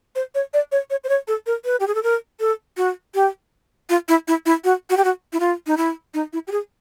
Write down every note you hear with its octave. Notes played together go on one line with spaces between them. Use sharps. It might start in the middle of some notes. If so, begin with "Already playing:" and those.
C5
C#5
D5
C#5
C#5
C5
C#5
A4
A#4
B4
G4
G#4
A4
A#4
A4
F#4
G4
F4
E4
E4
E4
F#4
F#4
G4
F#4
E4
F4
D#4
E4
D#4
E4
G4
G#4